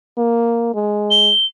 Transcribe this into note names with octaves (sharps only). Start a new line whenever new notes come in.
A#3
G#3
G7